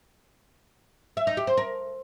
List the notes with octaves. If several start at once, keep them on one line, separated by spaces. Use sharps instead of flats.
E5
D#4
G4
C5
A#4